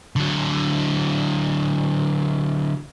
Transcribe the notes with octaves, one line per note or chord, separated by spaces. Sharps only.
D3 F#3